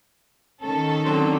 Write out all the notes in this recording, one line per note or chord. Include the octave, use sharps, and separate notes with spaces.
D#3 C#4 A4
D3 F#3 C4